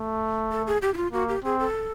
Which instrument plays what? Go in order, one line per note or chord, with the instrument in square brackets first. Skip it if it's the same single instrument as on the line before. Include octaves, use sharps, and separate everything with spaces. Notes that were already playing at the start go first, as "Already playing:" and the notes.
Already playing: [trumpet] A3
[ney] A4
G#4
G4
E4
F4
[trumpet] A#3 [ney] F#4
[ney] G4
[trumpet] C4 [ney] G#4
[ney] A4